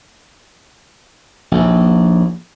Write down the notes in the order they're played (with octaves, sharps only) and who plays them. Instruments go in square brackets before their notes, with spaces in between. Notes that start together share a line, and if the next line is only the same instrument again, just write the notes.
[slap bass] A#1 D#2